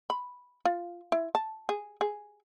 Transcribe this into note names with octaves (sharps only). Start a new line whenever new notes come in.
B5
F4
E4
A5
G#4
G#4